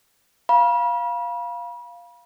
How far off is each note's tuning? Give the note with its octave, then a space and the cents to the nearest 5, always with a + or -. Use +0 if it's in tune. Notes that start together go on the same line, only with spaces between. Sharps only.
F5 +0 B5 -35